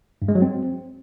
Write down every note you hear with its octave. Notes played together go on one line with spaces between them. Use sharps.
G2
G#3
F#3
C4